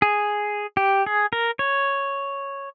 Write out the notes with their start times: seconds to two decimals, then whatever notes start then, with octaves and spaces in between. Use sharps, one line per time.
0.02 G#4
0.77 G4
1.06 G#4
1.33 A#4
1.59 C#5